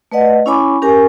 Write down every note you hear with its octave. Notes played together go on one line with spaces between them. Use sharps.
A3 B4 D5 D#5 F#5
C#4 E4 C#5 G#5 B5 D6
C#4 G4 A#4 G#5